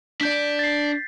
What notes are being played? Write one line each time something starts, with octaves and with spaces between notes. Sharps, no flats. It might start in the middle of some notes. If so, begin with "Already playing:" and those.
D4 D5 G6 B6
A6 C7